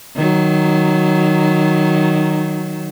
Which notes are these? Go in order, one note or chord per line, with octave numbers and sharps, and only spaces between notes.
D#3 F#3